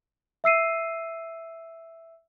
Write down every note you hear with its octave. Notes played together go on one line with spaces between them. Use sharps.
E5 E6 C7 D#7